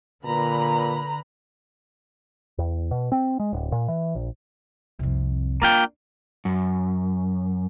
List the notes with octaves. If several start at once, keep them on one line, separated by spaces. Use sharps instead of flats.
A#2 D3 B4 A#5 B5
E2
B2
C4
G#3
D1
A#2
E3
A#1
C2 F2
A#3 D4 F4 G5
F#2